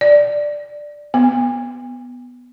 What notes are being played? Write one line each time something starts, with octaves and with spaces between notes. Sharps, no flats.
D5
B3